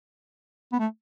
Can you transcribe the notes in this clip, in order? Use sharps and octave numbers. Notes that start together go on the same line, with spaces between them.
B3
A3